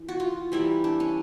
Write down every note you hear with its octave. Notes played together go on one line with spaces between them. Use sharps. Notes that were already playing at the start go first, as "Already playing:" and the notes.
Already playing: E3
F#4
F4
E3 G3 A#3 E4
D4
C#4